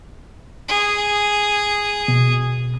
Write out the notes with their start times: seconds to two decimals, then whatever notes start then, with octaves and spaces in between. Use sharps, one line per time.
0.69 G#4
2.08 B2